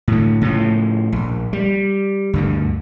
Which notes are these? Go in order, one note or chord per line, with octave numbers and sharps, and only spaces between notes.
A2 D3
A2 C#3 F3
A#1
G3
D2 G2 D3